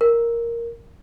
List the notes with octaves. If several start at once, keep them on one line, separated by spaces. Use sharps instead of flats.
A#4